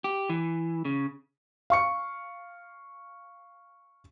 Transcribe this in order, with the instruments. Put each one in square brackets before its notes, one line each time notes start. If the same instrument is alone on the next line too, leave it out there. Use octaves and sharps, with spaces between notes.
[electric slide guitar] G4
E3
C#3
[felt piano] F5 C#6 C#7